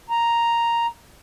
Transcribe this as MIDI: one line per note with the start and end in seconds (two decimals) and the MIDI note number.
0.10 0.86 82